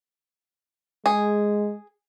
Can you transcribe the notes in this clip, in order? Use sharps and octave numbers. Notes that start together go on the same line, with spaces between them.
G#3 G#4